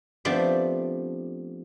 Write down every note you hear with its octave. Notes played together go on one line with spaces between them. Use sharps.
F3 A3 B3 C4 D4 G4